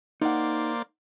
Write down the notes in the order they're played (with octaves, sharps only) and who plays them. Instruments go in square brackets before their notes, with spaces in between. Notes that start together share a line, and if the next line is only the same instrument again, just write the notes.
[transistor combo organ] A#3 C5 D5 [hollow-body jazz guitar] D#4 F#5